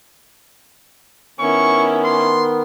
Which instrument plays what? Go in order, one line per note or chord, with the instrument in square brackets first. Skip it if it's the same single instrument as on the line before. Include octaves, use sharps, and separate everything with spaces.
[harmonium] D#3 B3 [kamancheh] C#4 E4 [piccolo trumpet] C#6
[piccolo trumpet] C6